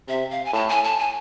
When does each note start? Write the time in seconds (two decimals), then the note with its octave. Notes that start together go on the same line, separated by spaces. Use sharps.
0.08 C3 E5
0.31 F5
0.45 G#5
0.53 A2 A5
0.69 G#5
0.84 A5
0.99 G#5